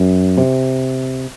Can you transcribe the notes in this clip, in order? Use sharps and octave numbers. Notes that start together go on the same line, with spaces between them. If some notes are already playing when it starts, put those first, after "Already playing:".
Already playing: F#2
C3